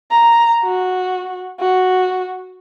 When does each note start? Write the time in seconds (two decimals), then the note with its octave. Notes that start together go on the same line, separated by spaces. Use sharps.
0.11 A#5
0.64 F#4
1.60 F#4